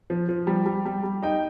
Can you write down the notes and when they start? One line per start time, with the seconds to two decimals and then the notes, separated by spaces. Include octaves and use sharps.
0.10 F3
0.29 F3
0.47 G3
0.66 G3
0.85 G3
1.03 G3
1.23 D#4 G5